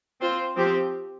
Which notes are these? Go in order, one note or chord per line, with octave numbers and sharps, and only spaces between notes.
C4 F4 C5
F3 C4 G4